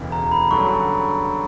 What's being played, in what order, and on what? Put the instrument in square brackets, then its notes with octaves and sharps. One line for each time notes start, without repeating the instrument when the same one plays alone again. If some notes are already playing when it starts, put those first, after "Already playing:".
Already playing: [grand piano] E1 D2 C#3 E3
[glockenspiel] A#5
B5
[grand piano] G2 D3 F#3 C#4 [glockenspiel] C#6